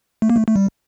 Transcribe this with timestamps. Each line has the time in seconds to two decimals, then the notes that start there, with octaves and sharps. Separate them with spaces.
0.22 A3
0.30 A#3
0.36 A3
0.48 A3
0.56 G3